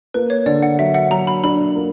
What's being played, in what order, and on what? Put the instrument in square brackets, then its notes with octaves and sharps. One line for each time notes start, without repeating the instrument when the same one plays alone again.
[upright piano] A#3 [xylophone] B4
[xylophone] C#5
[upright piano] D3 [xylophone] D5
[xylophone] F#5
[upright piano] F#3 [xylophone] E5
[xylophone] F#5
[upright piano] F#3 [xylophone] A#5
[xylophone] B5
[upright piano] D4 [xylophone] B5
[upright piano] A#3